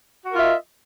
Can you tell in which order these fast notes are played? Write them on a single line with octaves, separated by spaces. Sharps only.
F#4 A#4 F4 E5 D#5